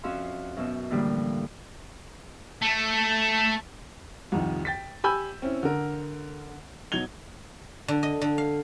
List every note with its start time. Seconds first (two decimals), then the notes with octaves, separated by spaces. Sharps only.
0.03 F2 C#4 F#4 E5 F5 C6
0.57 F#2 B2 E5
0.91 A2 D3 E3 F3 G3 A#3
2.62 A3
4.32 C2 F2 D#3 F3
4.65 G5 A6 B6
5.04 G4 G#5 B5 E6 G6
5.42 C4 C#4 E4
5.63 D3 A#4
6.92 B2 F#3 D#4 G#6 F7 G7
7.88 D3
8.03 D#5
8.21 D3
8.38 F5